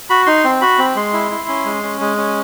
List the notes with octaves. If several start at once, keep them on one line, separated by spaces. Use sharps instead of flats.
F#4 B5
D#4 C6
C4
F#4 B5
C4
G#3 C6
E4
E4
C#4
G#3
C#4
G#3
C#4